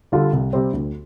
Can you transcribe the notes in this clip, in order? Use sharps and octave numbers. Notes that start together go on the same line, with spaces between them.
D3 G3 F4 A4
C2
C3 G3 C4
D2